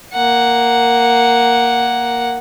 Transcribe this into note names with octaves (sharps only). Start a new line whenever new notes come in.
A#3 F#5